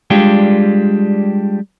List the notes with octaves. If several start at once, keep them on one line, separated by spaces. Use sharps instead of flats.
G3 G#3 D4 F4 G4